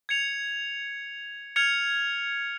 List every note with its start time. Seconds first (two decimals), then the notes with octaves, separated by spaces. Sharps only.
0.09 G#6 C#7 F7
1.56 F6 G#6 C#7 F7